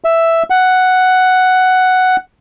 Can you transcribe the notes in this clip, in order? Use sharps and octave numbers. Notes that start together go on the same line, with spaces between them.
E5
F#5